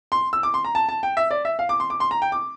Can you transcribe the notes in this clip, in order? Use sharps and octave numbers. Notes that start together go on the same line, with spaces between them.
C6
E6
D6
C6
A#5
A5
A5
G5
E5
D5
E5
F5
D6
C6
D6
C6
A#5
G5
D6